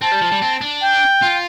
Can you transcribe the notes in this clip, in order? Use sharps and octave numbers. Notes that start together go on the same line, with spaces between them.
C4 A5
G3
F3
G3
C4
D4
G5
F4